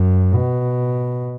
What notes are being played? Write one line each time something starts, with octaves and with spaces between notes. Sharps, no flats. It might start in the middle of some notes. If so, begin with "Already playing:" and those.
Already playing: F#2
B2